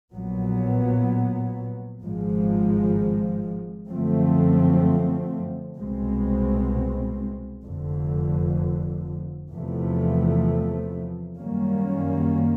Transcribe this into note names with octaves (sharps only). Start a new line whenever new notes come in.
A#1 A#2 F#3 B3
G#1 G#2 F3 G#3
F#2 D3 F3 A3 C4
C2 B2 G#3 C4
F1 F2 D3
E2 C3 F3 A3
F#2 D#3 G3 A#3 C#4